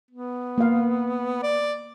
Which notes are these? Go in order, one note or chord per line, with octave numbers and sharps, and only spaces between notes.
B3
A#3 F5
D5